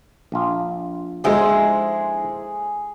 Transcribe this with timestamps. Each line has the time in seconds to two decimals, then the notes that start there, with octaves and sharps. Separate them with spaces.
0.32 A#1 F4
1.24 D3 G#3 D#4 E4 G#4 C5